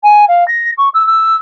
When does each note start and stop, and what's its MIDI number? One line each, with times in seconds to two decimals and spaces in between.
0.03 0.25 80
0.28 0.46 77
0.48 0.71 94
0.77 0.89 85
0.94 1.03 88
1.07 1.36 88